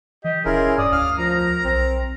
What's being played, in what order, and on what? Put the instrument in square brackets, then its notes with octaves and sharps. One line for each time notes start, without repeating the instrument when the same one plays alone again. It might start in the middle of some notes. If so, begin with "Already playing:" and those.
[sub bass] E3 [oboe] G4 [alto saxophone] D#5
[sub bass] D#1 [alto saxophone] C#4 [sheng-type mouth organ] E4 G#4 A#4 [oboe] F4
[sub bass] G2 [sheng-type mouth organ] D5 [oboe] D#6
[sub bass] D2 [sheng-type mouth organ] F5 F6
[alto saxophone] F3 [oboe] A#4 [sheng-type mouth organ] A#5
[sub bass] B1 [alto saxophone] C4